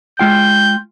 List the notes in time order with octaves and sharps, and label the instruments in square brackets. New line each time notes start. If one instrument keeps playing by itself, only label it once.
[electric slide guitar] G#3 F4 G5 [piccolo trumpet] G6